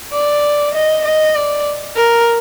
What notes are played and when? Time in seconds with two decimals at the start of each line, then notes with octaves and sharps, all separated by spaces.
0.13 D5
0.74 D#5
1.04 D#5
1.35 D5
1.96 A#4